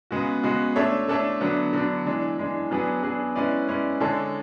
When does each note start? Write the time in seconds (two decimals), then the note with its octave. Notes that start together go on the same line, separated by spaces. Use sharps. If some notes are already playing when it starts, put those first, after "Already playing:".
0.11 C#3 G#3 B3 F#4
0.43 C#3 G#3 B3 F#4
0.76 A3 D4 A4 C#5 E5
1.08 A3 D4 A4 C#5 E5
1.41 D3 F#3 B3 D4
1.73 D3 F#3 B3 D4
2.06 E3 G#3 D4
2.38 E3 G#3 D4
2.71 F#3 B3 D4 G#4 B4
3.03 F#3 B3 D4 G#4 B4
3.35 G#3 C#4 E4 B4 D5
3.68 G#3 C#4 E4 B4 D5
4.00 D3 G#3 D4 A4 C#5